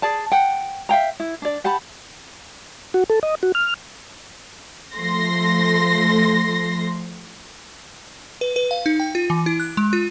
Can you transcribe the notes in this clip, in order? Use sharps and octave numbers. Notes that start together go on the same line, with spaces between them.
G#4 D5 A5
F#5 G5
E5 F5 G5 A#5
E4
D4 D5
G4 F#5 A5 B5
F#4
A4
D#5
F#4
F6
F3 A3 C6 A#6
B4
B4
F5
D#4
G5
F4
E3
E4
F#6
G#3
F4